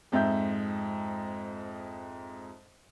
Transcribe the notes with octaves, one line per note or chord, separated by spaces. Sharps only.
F2 G#2 E5 G6